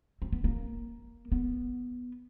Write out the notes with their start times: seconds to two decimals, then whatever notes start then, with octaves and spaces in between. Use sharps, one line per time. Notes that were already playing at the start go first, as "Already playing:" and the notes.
0.22 C4
0.32 B3
0.44 A#3
1.32 B3